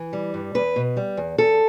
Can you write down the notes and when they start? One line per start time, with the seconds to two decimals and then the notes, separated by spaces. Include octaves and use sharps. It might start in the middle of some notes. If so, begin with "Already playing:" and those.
Already playing: E3
0.13 G3
0.34 G2
0.55 E2 B4
0.76 B2
0.97 G3
1.17 E2
1.38 E2 A4